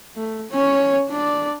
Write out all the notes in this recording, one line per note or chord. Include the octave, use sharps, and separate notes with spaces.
A3
C#4 C#5
D4 D5